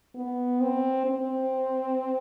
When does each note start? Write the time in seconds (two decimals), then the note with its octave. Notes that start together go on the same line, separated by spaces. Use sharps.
0.15 B3
0.60 C4
1.06 C4